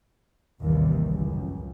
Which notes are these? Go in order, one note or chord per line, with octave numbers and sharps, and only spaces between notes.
A1 D#2 C3 D#3 E3 G3
C#2 F#2